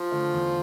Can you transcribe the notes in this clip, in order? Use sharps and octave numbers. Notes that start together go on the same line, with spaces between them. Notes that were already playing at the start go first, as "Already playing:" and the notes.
Already playing: F3
D3 A3
E2